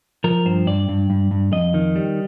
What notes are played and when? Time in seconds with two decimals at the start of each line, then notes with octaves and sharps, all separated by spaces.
0.24 F3 A#4
0.45 G2 C5
0.67 G2 D5
0.89 G2
1.10 G2
1.31 G2
1.52 F2 D#5
1.74 D#3
1.96 G3